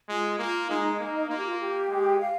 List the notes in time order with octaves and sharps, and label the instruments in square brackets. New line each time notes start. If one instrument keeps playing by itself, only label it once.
[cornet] G#3 [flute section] F4
[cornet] A#3 [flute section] F4
[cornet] G#3 [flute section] D#4
[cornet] A#3
[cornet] A#3 [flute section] F4
[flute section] G4
F4
G4
[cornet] G#3
[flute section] F5